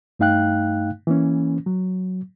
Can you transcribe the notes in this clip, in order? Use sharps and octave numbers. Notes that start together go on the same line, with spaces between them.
G2 A3 D#4 F5 G5 F#6
E3 A#3 C#4
F#3